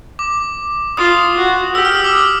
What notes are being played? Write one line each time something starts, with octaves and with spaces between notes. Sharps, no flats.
D6
F4 D#6
F#4
G4 E6
F6
D#6
D6